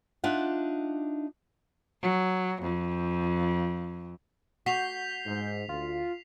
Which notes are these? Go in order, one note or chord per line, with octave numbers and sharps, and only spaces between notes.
D4 D#4 F4 E5 F#5
F#3
F2
F#4 G6 B6 C7 F7
G#2
D2 F4